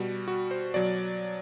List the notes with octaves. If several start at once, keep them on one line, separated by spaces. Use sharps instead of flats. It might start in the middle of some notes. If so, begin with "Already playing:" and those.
Already playing: B2 G3 F#4
F#4
C5
B2 F#3 D5